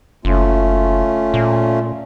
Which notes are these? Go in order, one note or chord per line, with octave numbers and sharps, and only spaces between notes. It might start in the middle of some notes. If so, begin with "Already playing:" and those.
F#1 A3 C#4 F4
A#2